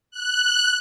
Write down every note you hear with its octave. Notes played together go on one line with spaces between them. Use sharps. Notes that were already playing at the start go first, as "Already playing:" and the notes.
F#6